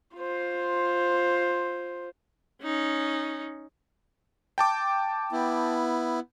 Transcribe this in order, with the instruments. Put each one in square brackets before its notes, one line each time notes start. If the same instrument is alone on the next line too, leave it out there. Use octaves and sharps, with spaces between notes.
[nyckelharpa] F4 C5
[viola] C#4 D#4
[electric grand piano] G5 A5 D6
[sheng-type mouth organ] B3 E4